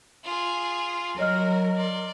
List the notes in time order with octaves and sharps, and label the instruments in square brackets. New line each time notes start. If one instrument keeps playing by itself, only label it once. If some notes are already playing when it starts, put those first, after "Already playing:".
[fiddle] F4 G#4
[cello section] F#3 A#4 [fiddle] F#4 [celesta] C#5 D#5 F6
[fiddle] D5 C6